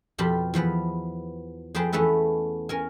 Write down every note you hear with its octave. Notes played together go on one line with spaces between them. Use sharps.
F2 B2 F4 G4 A5 B5
E2 F3 B3 B4
F2 G#4 B4 C5 G5 A5
E2 A3 B3 C#4 A4 B4
C#4 A#4 G#5